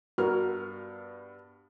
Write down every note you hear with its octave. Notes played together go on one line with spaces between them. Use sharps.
G2 B3 F#4 A#4 F6